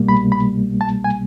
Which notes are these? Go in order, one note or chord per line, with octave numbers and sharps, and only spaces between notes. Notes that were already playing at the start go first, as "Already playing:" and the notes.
Already playing: C2 B2 G3 A#3
B5
B5
A5
G#5